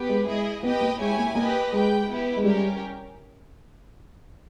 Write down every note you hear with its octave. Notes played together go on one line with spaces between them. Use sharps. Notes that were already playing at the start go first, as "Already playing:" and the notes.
Already playing: B3 G4 B4
G#3
G#3 E4 G#4 D#5
B3 G4 B4 D#5 G5
A#3
G#3 E4 G4 C#5 G#5
A#3
A#3 G4 B4 D#5
G#3 G4 B4 G5
B3 E4 G4 B4
G#3
G3 C#4 G4 A#4